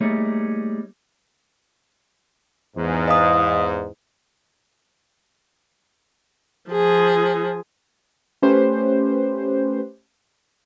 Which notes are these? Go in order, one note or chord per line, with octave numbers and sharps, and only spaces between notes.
G3 A3 A#3 D#4 G#4 C#5
E2 G#2
D#5 F5 D#6
F3 G#4
A3 C#4 G4 B4 C5